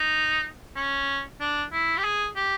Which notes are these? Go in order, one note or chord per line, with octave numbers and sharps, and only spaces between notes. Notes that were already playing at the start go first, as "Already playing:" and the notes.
Already playing: D#4
C#4
D4
E4
G4
G#4
G4